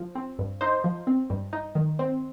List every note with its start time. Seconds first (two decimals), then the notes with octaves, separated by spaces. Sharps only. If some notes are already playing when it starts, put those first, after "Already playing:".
Already playing: F3
0.15 C4
0.39 G2
0.61 D#4 C5
0.84 F3
1.07 C4
1.30 G2
1.53 D#4
1.75 D#3
1.99 C4